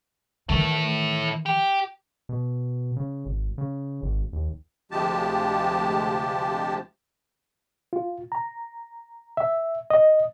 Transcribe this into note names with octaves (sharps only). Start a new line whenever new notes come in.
D#3 E3 E4 A4
G4
B2
C#3
G#1
C#3
G#1
D#2
D2 C3 F3 G#3 G4 A5
F4
A#5
E5
D#5